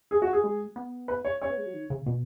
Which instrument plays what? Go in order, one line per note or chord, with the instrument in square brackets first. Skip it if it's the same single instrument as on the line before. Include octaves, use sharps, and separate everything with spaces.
[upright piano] G#4
F#4
G#4
[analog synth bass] G#3
B3
[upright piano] B4
C#5
[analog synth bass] C#4 [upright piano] C#5
[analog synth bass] B3
G#3
F#3
D#3
C#3
B2